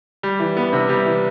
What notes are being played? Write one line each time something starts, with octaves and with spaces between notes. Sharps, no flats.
G3
E3
B3
C3
G3
E3